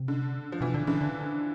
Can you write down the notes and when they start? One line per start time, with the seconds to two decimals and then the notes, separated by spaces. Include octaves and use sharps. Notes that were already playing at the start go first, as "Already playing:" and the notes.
Already playing: C3
0.08 D3
0.52 F3
0.61 B2 E3
0.74 D3
0.87 D3 E3
1.01 D3